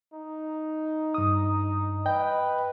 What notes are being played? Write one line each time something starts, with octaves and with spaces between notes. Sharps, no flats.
D#4
G2 D#6
B4 D#5 G5